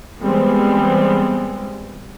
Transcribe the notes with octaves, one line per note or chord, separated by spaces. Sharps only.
E3 G3 G#3 B3 C4